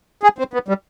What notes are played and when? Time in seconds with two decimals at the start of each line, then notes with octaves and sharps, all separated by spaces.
0.23 G#4
0.39 C4
0.54 B3
0.68 G3